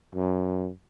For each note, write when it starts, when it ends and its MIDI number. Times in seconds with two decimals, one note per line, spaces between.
0.15 0.70 42